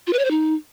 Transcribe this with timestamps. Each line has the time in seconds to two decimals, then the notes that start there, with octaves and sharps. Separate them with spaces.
0.07 F4
0.13 B4
0.19 C#5
0.25 C5
0.31 D#4